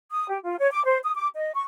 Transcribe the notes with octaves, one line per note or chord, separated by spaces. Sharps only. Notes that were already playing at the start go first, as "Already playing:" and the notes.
D#6
G4
F4
C#5
D6
C5
D#6
D6
D#5
C#6